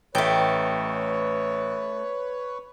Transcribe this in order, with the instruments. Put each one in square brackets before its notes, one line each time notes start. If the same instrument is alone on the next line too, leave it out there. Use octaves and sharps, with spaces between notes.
[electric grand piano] A1 [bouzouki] A3 G5 [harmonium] B4 C#5